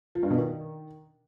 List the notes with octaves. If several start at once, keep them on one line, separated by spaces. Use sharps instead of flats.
F3
G2
B2
D#3